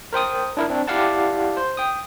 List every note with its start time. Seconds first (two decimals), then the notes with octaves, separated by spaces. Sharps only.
0.13 A#4 C5 G5 D#6
0.57 D4 E4 A#4
0.70 C4 D4
0.88 E4 G4 D5 F5 F#5 A5
1.57 C5
1.77 G5 D#6